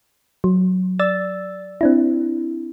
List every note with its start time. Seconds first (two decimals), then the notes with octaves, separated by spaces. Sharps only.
0.44 F#3
0.99 D5 E6 A6
1.81 C4 D4 E4